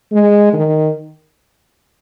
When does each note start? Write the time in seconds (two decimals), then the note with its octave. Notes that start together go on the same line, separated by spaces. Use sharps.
0.12 G#3
0.53 D#3